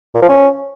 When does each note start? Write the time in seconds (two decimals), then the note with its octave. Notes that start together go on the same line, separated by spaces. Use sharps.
0.15 A#2
0.22 F3
0.29 C#4